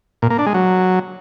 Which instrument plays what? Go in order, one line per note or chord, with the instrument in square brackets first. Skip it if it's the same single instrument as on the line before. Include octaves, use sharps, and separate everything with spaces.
[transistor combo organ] A#2
A#3
D4
G#3
F#3